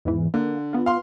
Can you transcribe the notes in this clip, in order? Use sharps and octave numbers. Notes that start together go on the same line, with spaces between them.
E2 G#2 E3
D3 A#3
B3 F4
F5 C6